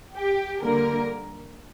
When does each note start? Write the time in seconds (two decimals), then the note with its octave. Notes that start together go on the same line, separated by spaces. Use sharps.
0.15 G4
0.62 D3 G3 A#3 A#4